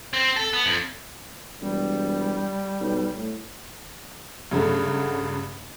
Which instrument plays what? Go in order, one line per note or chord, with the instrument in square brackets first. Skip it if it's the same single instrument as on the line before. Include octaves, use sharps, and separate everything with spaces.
[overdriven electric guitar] C4
A4
B3
F2
[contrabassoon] E1 [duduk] G3
[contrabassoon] B1
A2
[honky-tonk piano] G2 C#3 F#3 A3